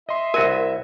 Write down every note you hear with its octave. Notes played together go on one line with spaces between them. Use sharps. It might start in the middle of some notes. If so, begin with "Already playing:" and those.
D#5 E5 C6
C2 F#4 A#4 G#5